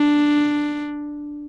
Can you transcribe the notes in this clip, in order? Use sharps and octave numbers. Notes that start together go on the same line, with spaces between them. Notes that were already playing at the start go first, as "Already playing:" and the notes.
Already playing: D4